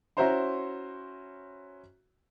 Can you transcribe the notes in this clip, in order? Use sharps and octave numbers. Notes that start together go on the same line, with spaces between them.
C#4 E4 F#4 C5 A#5 C6